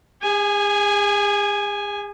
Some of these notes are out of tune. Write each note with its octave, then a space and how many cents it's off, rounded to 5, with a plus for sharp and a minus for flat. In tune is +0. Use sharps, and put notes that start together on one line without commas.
G#4 -40 G#5 +0